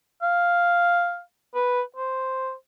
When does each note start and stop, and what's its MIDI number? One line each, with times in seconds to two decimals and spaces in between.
0.23 1.20 77
1.55 1.82 71
1.97 2.53 72